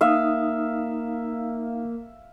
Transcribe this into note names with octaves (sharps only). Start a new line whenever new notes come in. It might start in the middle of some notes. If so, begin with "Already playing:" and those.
A#3 D#4 E5 F5 D#6